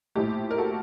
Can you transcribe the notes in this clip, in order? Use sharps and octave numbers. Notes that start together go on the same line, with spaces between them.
A#1 A2 A3 G4
A#4
F#4 A4